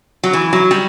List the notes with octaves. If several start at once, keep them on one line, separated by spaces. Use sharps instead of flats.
F#3
E3
F#3
G3